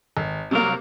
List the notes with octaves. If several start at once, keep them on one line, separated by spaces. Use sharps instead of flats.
G#1
C2 C3 F#3 G3 A#3 A#4